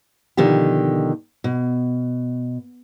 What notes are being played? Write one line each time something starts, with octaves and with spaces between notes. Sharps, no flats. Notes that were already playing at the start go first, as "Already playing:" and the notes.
B2 D3 D#3 F3 G4
B2